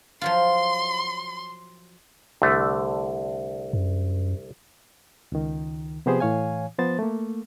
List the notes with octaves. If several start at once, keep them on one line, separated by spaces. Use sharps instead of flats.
F3 F#3 F4 C6
C2 D3 A3
F#2
C#2 D#3
C3 F3 B3 G4 G#4 C5
A2 E3 C#5 F5 G#5
F3 B3 C5 A6
A3 A#3